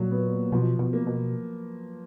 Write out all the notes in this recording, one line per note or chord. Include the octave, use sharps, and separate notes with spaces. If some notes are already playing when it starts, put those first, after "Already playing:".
Already playing: A#2 F#3
B3
B2 F3
B2
A#3
B2